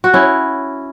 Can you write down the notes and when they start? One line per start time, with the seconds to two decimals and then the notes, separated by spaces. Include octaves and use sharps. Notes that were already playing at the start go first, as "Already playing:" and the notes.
0.04 F#4
0.14 C#4 E4